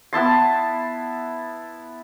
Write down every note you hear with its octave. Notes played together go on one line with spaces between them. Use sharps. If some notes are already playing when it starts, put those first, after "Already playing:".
B3 E4 A5 C6